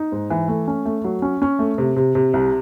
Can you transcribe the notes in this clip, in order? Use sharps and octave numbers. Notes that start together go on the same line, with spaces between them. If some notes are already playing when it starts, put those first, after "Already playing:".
Already playing: D#4
G#2
E3
A3
C#4
A3
F#3
C#4
C#4
A3
C3
C3
C3
C2